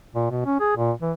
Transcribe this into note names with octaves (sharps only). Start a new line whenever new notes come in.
A#2
B2
C#4
G#4
A#2
E3